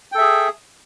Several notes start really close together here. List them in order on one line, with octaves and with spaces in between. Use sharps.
G5 A4 E5 G#4